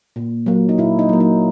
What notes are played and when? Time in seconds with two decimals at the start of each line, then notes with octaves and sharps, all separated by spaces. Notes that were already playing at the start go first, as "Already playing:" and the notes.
0.16 A#2
0.46 F#3 A#3
0.69 D#4
0.78 A#2 E4
0.99 D#4
1.09 F#3 A#3
1.20 D#4